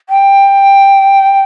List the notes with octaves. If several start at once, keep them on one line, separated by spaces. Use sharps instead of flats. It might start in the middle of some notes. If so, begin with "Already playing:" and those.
G5